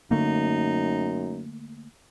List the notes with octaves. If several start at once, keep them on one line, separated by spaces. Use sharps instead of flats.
F#2 D3 A3 A#3 D#4